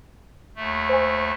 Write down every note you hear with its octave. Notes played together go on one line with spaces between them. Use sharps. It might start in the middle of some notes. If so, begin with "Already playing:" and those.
D#2 A3
C5 G#5